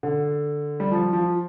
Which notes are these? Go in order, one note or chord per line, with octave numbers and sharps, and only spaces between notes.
D3
G3
F3
F3